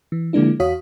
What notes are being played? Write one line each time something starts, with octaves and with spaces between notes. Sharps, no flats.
E3
D3 F3 G#3 A#3 D4 E4
E2 F#4 C#5 F5 D#6 B6